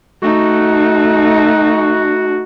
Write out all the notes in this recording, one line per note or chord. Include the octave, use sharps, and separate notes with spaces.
A3 D#4 F#4